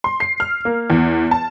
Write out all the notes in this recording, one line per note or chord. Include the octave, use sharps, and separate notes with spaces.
C6
C7
F6
A#3
E2
A5